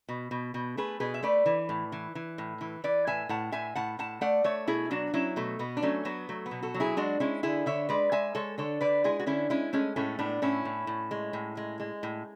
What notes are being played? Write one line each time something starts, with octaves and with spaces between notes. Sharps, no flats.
B2
B2
B2
A3 G#4 B4
B2 G#4 B4
E5
A3 B4 D5
E3
A2
E3
E3
A2
E3
E3 B4 D5
A2 E5 G#5
A2 F#5 A5
A2 E5 G#5
A2 F#5 A5
A2 F#5 A5
A3 D5 F#5
A3 C#5 E5
B2 E4 G#4
F#3 D4 F#4
F#3 C#4 E4
B2 A3
B2 B3
D4
F#3 A3 C#4
F#3 B3
F#3 A3
B3
B2
F#4 A4
F#3
E4 G#4
G#3 D4 F#4
G#3 C#4 E4
D3 E4 G#4
D3 C#5 E5
G#3 B4 D5
G#3 E5 G#5
G#3 A4 C#5
D3 A4 C#5
D3 B4 D5
G#3 E4 G#4
F#4
D3 C#4 E4
G#3 C#4 E4
G#3 A3 C#4
A2 A3 C#4
A2 B3 D4
A2 C#4 E4
A2
A2
G#3
A2
G#3
G#3
A2